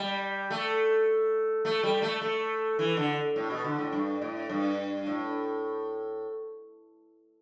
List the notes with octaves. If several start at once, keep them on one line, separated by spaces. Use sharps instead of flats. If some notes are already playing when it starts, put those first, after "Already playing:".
Already playing: G3
A3
A3
G3
A3
A3
E3
D3
A2
B2
D3
A2
G2
A2
G2
A2